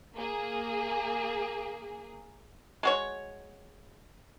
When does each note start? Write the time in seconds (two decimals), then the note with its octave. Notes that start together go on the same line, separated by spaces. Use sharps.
0.16 A#3 G#4
2.83 G#3 F#4 C#5